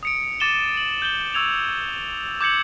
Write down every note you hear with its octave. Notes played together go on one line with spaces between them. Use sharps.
D#6 C#7 D7
D6 A6 D#7 E7 G7
F#7
G6 E7 G7
C#6 E6 G#6 F7
D6 G6 G#6 C#7 F#7